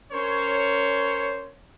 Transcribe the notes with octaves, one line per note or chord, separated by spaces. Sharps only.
C#4 A#4 C5 C#5